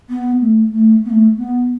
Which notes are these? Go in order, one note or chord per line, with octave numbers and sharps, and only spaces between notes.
B3
A3
A3
B3
A3
B3